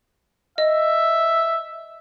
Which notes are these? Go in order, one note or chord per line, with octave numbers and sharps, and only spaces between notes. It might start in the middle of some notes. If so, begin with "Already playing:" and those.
D#5 E5